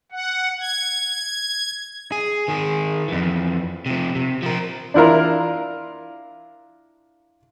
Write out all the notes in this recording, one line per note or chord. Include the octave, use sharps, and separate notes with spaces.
F#5
G#6
G#4
D#3 G#4
F2 E3
C3 F3
C3
F3 A#4
D4 E4 F4 A#4